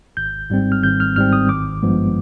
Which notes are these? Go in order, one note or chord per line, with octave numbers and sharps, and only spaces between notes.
G#1 G6
G#2 G3 C4
F6
G#1 G6
F6
G#2 G3 C4 F6
D#6
G#1 D6
G2 F3 G#3 B3